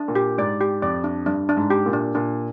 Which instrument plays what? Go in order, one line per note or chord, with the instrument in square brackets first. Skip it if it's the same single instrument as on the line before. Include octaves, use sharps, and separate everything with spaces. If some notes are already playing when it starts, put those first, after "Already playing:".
Already playing: [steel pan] D4
[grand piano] A#2
[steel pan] G4
[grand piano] G#2 [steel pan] D5
[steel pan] G4
[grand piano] F2 [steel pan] D5
[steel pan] D4
[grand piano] G2 [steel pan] D4
[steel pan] D4
[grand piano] G#2
[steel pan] G4
[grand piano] A#2
[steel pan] D4
[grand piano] A#2 [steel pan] D4